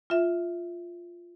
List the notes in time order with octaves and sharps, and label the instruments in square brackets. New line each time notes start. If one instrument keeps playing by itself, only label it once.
[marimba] F4 E5